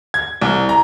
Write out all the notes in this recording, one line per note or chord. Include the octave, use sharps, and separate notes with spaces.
G#6
C2
A#5